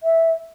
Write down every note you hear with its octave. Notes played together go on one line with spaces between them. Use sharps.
E5